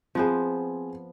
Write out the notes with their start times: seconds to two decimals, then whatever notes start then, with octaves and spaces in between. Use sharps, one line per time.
0.15 F3 B3 C4 G#4 C5